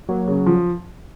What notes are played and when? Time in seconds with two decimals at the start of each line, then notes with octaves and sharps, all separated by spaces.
0.09 F#3 A#3
0.28 C#3
0.46 F3